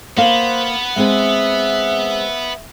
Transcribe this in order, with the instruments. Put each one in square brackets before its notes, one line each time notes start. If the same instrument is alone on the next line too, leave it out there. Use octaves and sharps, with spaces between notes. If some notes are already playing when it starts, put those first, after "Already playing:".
[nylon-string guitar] A#3 F5 [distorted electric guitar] B3 [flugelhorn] C5
[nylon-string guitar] G#3 C4 G#4 [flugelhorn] E5